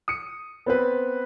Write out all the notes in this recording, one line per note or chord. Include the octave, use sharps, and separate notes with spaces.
D#6 C#7
B3 C4 B4